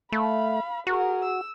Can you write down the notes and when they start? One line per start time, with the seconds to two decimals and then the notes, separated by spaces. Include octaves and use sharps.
0.12 A3 F5 B5
0.87 F#4 G#4 A#4
1.24 E6